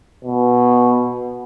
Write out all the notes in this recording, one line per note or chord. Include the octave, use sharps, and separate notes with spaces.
B2